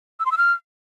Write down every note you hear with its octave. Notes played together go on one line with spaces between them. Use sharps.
E6
C6
E6
F6